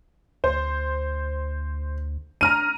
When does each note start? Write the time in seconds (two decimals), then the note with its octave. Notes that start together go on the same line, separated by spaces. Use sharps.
0.44 D2 C5
2.41 D4 A#5 F6 D#7